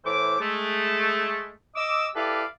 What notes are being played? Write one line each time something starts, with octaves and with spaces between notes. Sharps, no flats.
A2 E3 C5 D6
G#3 A3
D#5 D6 E6
E4 G4 A4 B4 D5 F5